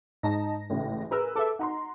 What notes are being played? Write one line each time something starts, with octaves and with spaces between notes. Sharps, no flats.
G#2 D#4 A5 A#6
A1 A2 C#3
G#4 A#4 B4 E6
A4 B4 E5 D6
D#4 F#5 A#5 C6